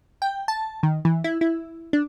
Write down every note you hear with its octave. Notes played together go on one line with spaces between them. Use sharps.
G5
A5
D#3
E3
E4
E4
D4